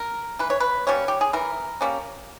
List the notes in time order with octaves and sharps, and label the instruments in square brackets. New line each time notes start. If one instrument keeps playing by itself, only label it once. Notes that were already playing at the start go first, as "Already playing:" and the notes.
Already playing: [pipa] A#4
E3 B4
C#5
B4
G3 A#3 C#4 C#5
G4
G#4
E3 A#4
G3 A#3 C#4